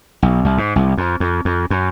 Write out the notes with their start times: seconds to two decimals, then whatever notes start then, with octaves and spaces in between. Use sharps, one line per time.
0.22 B1
0.44 C2
0.58 G#2
0.76 C2
0.98 F2
1.20 F2
1.45 F2
1.70 F#2